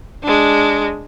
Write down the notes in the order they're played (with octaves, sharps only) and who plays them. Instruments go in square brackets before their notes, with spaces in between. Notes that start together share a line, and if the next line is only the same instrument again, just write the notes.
[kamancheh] G#3 D4